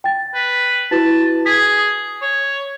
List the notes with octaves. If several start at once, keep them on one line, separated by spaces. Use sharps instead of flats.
G5 A6
B4
E4 F#4 B4 A5
G#4 B6
C#5